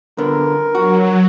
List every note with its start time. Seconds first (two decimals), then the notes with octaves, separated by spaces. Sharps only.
0.18 D3 B3 A#4
0.75 F#3 F#4